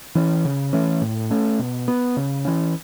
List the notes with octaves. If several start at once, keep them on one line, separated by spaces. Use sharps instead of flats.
E3 C#4
C#3
E3 A3 C#4
A2
A3 C#4
B2
B3
C#3
E3 C#4